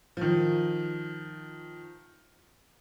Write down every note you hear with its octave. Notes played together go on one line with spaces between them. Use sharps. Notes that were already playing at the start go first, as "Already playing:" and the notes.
D#3 F3